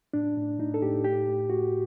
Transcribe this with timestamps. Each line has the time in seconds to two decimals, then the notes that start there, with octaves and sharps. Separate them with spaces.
0.14 A2 D4
0.37 A2
0.59 A2 D#4
0.74 A4
0.82 A2 G4
1.04 A2 G4
1.28 A2
1.50 A2 F#4